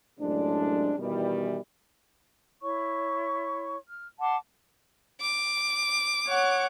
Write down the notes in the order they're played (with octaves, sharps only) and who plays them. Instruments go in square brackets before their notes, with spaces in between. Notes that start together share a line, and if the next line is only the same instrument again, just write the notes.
[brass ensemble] F#2 A2 C3 F3 G#3 D4
B2 D#3 E3 G3
[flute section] E4 C#5 C#6
F6
F#5 A5 C6 D6
[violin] D6
[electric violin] C#5 F#5